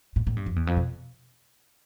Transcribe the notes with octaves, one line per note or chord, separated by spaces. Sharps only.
A2
A2
G2
F2
E2
F2
B2